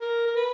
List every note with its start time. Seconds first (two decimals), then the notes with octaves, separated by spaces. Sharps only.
0.01 A#4
0.26 A#4
0.36 B4